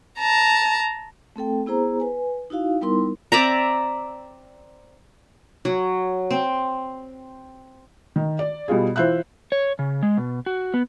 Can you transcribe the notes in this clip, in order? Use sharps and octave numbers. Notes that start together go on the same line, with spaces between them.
A5 A#5
A3 C4 A4 G5
B3 E4 G#4 C5 A#5
B4 G#5
D#4 E4 F#4 F5
G3 B3 D#4 E4 A#4 C6
C4 D5 E5 A#5
F#3
C4
D#3
D5
B2 G3 F4 G#4
E3 F4 C5 E5 F#6
C#5
C#3
G#3
B2
F#4
B3